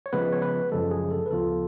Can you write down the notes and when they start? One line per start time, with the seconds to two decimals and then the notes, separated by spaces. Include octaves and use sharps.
0.06 C#5
0.13 C#3 F3 G#3 B3 B4
0.33 C#5
0.42 B4
0.72 F#2 C#3 F3 G#3 A4
0.91 G#4
1.11 A4
1.26 B4
1.30 D2 C#3 F3 B3 F4 A4